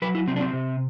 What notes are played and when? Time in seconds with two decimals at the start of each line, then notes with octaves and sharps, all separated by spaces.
0.02 F#3 B4
0.15 E4
0.27 C3 C4
0.36 D4
0.40 C4
0.53 C3